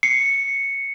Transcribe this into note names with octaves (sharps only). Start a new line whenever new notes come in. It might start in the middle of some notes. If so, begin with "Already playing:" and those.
C7 C#7